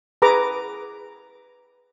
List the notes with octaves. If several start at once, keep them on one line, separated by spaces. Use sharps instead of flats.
G#4 B4 A#5 D6